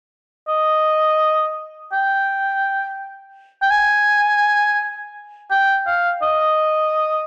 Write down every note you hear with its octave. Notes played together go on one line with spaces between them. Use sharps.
D#5
G5
G5
G#5
G5
F5
D#5